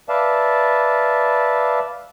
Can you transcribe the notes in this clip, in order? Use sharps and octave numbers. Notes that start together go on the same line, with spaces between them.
B4 D5 E5 F5 A5